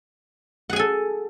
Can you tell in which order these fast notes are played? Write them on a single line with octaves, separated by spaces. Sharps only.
F#5 G#4 G#5 A4